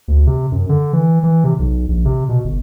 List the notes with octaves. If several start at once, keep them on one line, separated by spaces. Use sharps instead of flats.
D2
C3
F#2
D3
E3
E3
C3
B1
A#1
C3
B2
G1